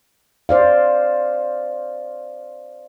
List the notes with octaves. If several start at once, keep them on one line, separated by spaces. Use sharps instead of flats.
C5 D5 F5